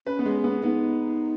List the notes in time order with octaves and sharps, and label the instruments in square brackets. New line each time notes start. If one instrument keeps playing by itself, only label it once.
[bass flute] C#4 [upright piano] B4
[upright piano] B3
G#3
B3
[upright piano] B3 [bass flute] D#4